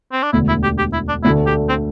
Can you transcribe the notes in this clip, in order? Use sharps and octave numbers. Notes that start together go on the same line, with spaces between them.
C4
D4
E1 D2 D3 A3 E4
E4
G4
G4
E4
D4
D2 D3 A3 D4 E4
G4
C4